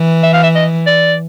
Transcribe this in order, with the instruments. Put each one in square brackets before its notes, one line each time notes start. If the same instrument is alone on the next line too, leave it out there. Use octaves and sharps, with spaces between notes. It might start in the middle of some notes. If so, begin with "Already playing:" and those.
Already playing: [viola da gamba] E3
[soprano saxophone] E5
F5
E5
D#5
D5